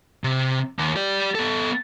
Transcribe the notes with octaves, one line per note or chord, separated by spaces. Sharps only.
C3
D#2
G4 D5
B3 A4